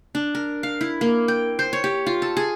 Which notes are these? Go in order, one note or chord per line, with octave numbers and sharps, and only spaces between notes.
D4
A#4
F5
E4
A#3
G5
C5
C#5
G4
F4
A4
G#4